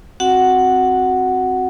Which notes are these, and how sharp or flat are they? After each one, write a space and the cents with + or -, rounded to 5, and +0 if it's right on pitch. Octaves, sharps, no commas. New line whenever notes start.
C4 +10 F#4 +0 F#5 +5